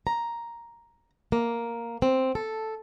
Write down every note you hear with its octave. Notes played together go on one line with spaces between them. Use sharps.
A#5
A#3
C4
A4